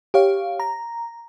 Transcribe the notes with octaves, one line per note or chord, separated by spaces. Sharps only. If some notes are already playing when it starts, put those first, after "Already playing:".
G4 C#5 F5
A#5